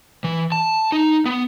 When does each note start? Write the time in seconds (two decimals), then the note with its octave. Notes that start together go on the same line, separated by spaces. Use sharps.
0.24 E3
0.52 A5
0.92 D#4
1.26 B3